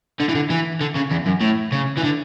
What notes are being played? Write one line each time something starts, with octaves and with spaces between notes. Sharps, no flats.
D3
E3
D3
E3
D3
C#3
E2
F#2
A2
C#3
E3
D3